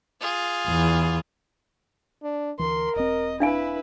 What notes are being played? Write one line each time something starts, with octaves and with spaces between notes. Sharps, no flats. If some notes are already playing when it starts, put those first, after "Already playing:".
F4 G#4
E2
D4
D2 E3 A#4 C6
E1 C4 D#5
D4 E4 B4 F5 G#5